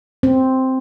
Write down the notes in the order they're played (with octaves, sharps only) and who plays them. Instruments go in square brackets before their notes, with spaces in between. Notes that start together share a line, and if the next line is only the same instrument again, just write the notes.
[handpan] C4